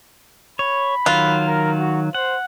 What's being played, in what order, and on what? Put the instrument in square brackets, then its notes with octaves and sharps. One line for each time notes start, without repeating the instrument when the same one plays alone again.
[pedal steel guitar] C#5 [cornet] B5
[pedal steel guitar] D#3 F#3 F#6 [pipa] F4
[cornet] A#4
F#4
[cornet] C5 [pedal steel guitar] F#5